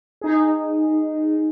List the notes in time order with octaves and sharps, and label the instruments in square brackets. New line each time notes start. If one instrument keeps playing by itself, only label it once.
[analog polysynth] D#4 G#4